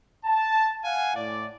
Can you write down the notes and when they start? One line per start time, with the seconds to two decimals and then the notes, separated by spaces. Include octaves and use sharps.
0.25 A5
0.84 F5 F#5 G#5
1.16 A2 D5